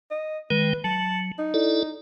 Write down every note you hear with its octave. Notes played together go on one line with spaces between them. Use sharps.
D#5
D#3 G#3 B4 G5
F#3 A5
D#4
E4 A4 D5